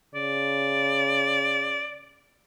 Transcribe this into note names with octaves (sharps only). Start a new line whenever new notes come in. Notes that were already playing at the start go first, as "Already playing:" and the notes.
C#3 D5